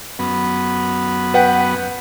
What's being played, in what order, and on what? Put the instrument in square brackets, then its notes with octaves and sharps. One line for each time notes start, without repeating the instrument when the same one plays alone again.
[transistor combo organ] F#2 B3
[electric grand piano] B4 F#5 G5